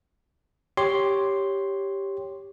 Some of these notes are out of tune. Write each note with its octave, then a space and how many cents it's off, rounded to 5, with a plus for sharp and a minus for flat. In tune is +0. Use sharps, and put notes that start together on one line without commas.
G4 +0 C#5 +0 C6 +0